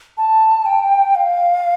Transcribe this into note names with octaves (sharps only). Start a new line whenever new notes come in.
A5
G5
F5